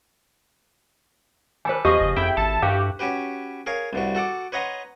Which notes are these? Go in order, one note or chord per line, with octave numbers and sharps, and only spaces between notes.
G3 A4 B4 C5 G#5
E2 F3 G4 G#4 D#5
F#1
F2 E4 G5
G#1 A4 A5
G2 F#4 G4 F5
C#4 F#4 G4 B4
G#4 A#4 C#5 F5
C2 G2 F#4
F#4 A4 F#5 D6
B4 C#5 D#5 F#5 A#5 C6